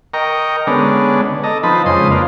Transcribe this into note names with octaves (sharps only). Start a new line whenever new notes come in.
A#4 D#5 G5 A#5 C#6
D3 G#3 B3 C#4 D4
A4 D#5 A#5
F3 C4 D#4 B4 A5 B5
F2 C#3 G#3 C5 C6 D#6
A#3 D4 B4 F5